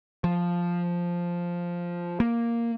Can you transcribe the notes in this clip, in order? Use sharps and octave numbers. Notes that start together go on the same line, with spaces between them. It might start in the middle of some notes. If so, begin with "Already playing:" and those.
F3
A#3